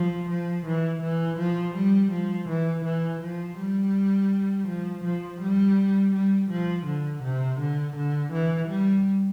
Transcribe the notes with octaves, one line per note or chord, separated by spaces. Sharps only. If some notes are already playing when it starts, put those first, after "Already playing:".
Already playing: F3
F3
E3
E3
F3
G3
F3
E3
E3
F3
G3
F3
F3
G3
G3
F3
D3
C3
D3
D3
E3
G3